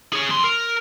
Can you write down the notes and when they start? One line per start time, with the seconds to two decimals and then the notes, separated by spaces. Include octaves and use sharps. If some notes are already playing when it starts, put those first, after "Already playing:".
0.13 G#4 C#5
0.29 F2 C6
0.44 A#4